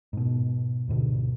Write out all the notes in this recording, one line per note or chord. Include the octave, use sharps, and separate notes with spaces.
G#2 B2
D2 G#2 B2 D3